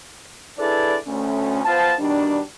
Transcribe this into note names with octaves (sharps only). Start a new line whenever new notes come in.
D4 E4 G#4 A4 B4 D5
D2 A3 C#4
B3 F4 C5 A5
B2 D#3 G3 D4